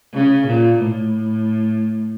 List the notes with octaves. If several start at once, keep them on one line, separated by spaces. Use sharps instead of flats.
C#3
A#2
A2